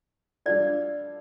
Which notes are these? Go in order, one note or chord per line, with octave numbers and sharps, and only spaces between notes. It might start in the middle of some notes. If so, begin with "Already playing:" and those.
G3 D4 F4 A4 D5